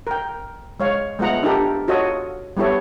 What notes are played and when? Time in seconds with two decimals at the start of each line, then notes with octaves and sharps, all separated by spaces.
0.07 A#4 G5
0.80 G#3 C#5 F5
1.19 G#3 A3 B3 F4 F#5 A#5
1.43 D4 D#4 F4 G4 A4 A#4
1.88 F4 F#4 A4 C#5 D#5
2.57 G3 B3 E4 A4 C#5